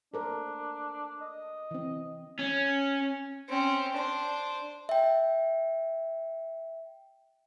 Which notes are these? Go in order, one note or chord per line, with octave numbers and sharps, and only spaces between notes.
D4 A4 A#4 C5
D#5
E3 C4
C#4
C4 C#4
D4 C5
E5 G5